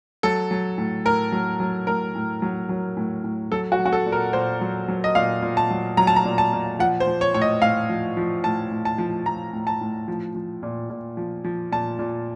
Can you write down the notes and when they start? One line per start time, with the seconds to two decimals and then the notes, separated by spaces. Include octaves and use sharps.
0.23 F#3 A4
0.51 F#3
0.78 A2
1.05 A2 A#4
1.32 F#3
1.60 F#3
1.87 A2 A#4
2.15 A2
2.42 F#3
2.69 F#3
2.97 A2
3.24 A2
3.52 F#3 A4
3.72 F#4
3.79 F#3
3.86 F#4
3.93 A4
4.06 A#2
4.12 A#4
4.33 A#2 C5
4.61 F#3
4.88 F#3
5.04 D#5
5.15 A#2 F5
5.42 A#2
5.57 A5
5.70 F#3
5.97 F#3 A#5
6.07 A5
6.16 A#5
6.25 A#2
6.38 A5
6.53 A#2
6.79 F3 F#5
7.00 C5
7.07 F3
7.21 C#5
7.34 A2 C#5
7.42 D#5
7.62 A2 F5
7.89 F3
8.17 F3
8.44 A2 A5
8.71 A2
8.85 A5
8.98 F3
9.26 F3 A#5
9.53 A2
9.67 A5
9.81 A2
10.08 F3
10.35 F3
10.63 A#2
10.90 A#2
11.17 F3
11.44 F3
11.72 A#2 A5
11.99 A#2